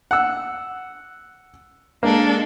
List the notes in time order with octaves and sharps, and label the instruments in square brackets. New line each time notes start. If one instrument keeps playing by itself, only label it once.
[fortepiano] F#5 E6
[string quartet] G#3 D4 A4 [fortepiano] A#3